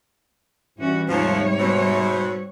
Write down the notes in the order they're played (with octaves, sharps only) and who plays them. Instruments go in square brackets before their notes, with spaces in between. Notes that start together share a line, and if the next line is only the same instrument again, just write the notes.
[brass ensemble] G2 E3 [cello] C#4 F#4
[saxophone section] D#2 F3 [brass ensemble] G#2 C3 C5 [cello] G3 C#5
[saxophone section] B2 C4